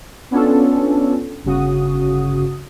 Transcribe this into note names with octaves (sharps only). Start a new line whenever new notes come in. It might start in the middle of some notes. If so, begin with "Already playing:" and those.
B3 C#4 D4 F4 A4
G1 C#3 F#4 D#6